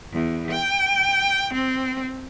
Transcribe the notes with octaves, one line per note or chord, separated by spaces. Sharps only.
E2
G5
C4